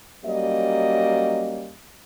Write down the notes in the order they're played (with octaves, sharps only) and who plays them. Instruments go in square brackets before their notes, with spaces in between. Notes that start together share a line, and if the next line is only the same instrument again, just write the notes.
[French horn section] F#3 G3 A#3 C#4 D#5